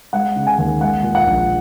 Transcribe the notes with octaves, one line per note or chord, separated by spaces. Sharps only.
G#3 F#5
C#3
G#5
D#2
G#3 F#5
A#2
F#5
A#1